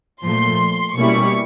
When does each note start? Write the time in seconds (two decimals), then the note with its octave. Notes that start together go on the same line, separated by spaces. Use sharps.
0.24 A#2 F3 A3 C6
0.97 B2 G3 A#3 C#4 E4 C#6